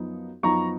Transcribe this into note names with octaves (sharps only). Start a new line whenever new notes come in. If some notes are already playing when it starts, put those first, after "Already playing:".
Already playing: F#2 F3 B3 D#4
F#2 F3 B3 D#4 A#5 C#6